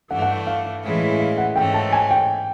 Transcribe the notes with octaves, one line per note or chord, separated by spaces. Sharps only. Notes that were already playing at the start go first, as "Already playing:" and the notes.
G2 E3 A3 D4 F#5
F#5
F5
A2 E3 G#3 C#4 E4
F5
F#5
G#2 E3 A3 C#4 G5
A5
G#5
G5